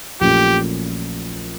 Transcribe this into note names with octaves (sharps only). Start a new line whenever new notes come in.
A#1 A#2 F#3 A3 C#4 G4